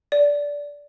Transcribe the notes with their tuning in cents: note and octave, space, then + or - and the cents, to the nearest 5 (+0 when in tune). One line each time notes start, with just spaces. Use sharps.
D5 -15